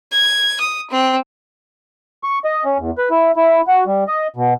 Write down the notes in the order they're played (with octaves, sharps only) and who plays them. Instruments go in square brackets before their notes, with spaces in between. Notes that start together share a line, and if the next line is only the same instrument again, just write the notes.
[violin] G#6
D#6
C4
[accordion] C#6
D#5
C#4
E2
B4
E4
E4
F#4
G3
D#5
B2